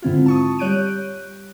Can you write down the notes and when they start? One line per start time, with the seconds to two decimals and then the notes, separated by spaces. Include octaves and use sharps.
0.02 G#2 D3 C4 E4 F4
0.26 A5 C#6 D#6
0.59 G3 C#5 F#6 G6 D7 D#7